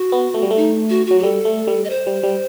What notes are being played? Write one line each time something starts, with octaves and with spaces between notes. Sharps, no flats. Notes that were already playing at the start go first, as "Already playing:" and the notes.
Already playing: F#4
B3
A3
G3
A3
D#4
F#4
F#3 F#4
G4
G3 A4
A3
G3
D#5
C5
G3
G3